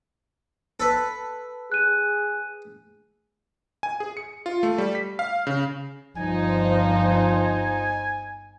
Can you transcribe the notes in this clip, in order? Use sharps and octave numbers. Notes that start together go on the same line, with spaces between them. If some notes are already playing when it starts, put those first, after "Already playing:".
A4 B4
G#4 F#6 D#7
G#5
G#4
C#7
F4
A3
G3
B6
F5
C#3
G1 F3 D#4 C5 G#5